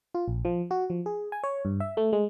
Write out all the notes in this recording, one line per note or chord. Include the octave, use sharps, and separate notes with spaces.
F4
A#1
F3
F#4
F3
G#4
G#5
C#5
G2
E5
A3
G#3